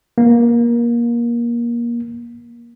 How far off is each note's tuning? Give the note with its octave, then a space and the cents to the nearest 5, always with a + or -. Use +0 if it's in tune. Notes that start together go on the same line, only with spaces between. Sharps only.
A#3 +20